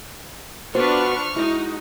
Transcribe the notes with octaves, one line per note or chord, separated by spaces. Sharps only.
B3 D4 F4 F#4 B4 C5 C#6 F6
G#3 D#4 E4 F#4